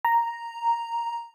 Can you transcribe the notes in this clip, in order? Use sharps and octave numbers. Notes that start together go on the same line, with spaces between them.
A#5